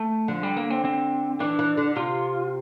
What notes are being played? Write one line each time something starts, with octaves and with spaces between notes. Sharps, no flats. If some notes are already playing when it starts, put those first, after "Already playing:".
Already playing: A3
D3 F3
G3
A#3
C4
C4
E3 D4
E3
D3
C3 F4